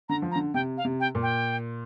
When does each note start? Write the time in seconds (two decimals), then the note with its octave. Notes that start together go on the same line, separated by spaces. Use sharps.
0.09 D3 A#5
0.22 F3
0.31 A#5
0.36 D3
0.54 C3 G5
0.77 F5
0.85 C3
1.00 G5
1.15 A#2
1.22 G5